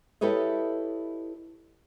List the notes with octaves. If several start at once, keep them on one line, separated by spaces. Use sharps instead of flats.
E4 G4 A4 B4 C#5 D#5